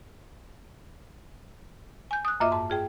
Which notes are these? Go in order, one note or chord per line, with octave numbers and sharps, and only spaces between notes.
G#5 G6
D#6 F#6
F#2 A#3 F4 D#5 E5 D6
G#2 A5
F4 G#4 G5